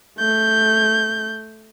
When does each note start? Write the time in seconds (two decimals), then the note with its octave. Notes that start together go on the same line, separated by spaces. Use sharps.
0.19 A3 G6